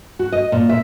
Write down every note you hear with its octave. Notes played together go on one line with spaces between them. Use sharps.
F#4
D#5
A#2
E5